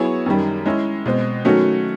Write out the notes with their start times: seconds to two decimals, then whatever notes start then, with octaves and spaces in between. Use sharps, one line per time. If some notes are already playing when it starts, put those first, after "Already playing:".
Already playing: F#3 B3 E4 G#4 C#5
0.26 F#2 D#3 G3
0.66 G#3 C#4 E4
1.06 B2 G#3 C4
1.44 D#3 F#3 A3 C#4 F#4